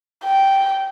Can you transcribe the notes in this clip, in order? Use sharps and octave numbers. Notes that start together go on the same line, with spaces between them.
G5